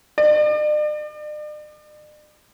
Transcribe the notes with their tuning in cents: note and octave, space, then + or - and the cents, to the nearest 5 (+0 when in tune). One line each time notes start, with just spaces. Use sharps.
D5 +45